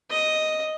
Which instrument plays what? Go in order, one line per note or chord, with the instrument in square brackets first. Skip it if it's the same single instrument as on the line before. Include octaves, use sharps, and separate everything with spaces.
[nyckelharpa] D#5